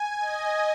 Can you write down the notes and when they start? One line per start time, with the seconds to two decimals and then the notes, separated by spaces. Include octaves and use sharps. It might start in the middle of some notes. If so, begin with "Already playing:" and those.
Already playing: G#5
0.19 D#5